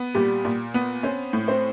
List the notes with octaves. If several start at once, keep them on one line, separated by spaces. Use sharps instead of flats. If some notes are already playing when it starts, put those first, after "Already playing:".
Already playing: B3
A#2 G3 G4
A#2
B3
C4 C#4 C5
A2
C4 C5